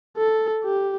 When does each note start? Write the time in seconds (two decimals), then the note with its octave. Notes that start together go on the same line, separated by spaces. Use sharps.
0.17 A4
0.64 G4